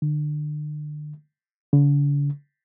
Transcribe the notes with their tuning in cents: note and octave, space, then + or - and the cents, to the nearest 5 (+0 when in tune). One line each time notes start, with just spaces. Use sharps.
D3 +35
D3 -45